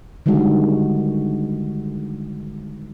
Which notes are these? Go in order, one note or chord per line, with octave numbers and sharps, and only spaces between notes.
D3 D#3 G3 G#3 F#4